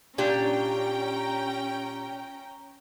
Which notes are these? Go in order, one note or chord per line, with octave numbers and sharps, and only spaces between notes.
A#2 C#4 D4 G4 G5 A#5